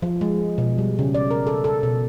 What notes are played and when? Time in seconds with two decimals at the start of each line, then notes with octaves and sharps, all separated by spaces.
0.02 F3
0.21 G#3
0.58 B2
0.78 G3
0.99 C#3
1.15 D5
1.31 A#4
1.47 A4
1.64 A4
1.83 B2